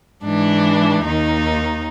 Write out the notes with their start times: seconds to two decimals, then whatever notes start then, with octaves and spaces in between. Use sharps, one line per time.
0.24 G#2 E3 D4
1.04 D#2 D#3 D#4